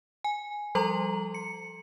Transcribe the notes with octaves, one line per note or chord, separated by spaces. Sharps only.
G#5
F3 G3 A4 A#5 C6 F#7
C#7